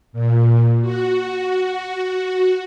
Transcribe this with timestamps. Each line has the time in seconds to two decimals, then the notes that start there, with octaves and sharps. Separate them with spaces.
0.12 A#2
0.81 F#4